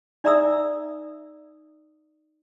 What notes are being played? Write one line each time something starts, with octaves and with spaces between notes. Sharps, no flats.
D#4 D5 E5 A#5 D#6 E6